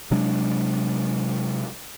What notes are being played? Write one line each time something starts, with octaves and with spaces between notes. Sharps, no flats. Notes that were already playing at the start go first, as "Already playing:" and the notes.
C3 F#3 G#3 D4